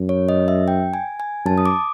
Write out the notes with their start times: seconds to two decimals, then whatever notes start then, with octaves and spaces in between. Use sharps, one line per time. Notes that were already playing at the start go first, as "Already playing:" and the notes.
Already playing: F#2
0.09 C#5
0.29 D#5
0.48 E5
0.68 G5
0.94 G#5
1.20 G#5
1.45 F#2 A5
1.58 D#6
1.66 D6